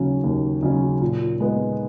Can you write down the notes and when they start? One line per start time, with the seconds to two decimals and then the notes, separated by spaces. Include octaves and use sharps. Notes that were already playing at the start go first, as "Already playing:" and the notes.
Already playing: D#2 C#3 F#3 C#4
0.24 D#2
0.63 C#3 F#3 C#4
1.01 A#2
1.40 G#3 B3